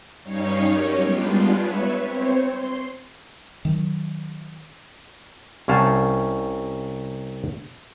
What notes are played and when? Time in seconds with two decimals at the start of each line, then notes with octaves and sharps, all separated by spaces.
0.23 G2 G3 C#4 D#4 C#5 F5
0.66 F#3 C#4 G4 A#4 C#5
0.99 G3 G#3 B3 D4 F4
1.55 B4 C#5 E5
2.02 C4 C5 C#5
2.40 C6
3.65 D#3 F#3
5.68 C2 C#4 F5 A5